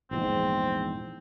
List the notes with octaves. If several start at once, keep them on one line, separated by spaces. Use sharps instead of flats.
A#1 E2 G#2 C4